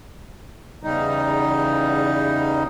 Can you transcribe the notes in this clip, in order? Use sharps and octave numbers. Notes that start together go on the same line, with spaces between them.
E2 C#3 G3 D#4